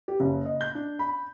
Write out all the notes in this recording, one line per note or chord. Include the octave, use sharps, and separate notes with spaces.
G4
F#1
D#5
G6
D4
B5